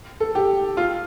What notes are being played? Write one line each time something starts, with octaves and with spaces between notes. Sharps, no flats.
A4
G4
F4